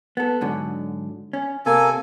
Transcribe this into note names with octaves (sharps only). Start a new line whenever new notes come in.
B3 A4
G#2 D3 F#3
C#4
C3 A#3 A4 G#5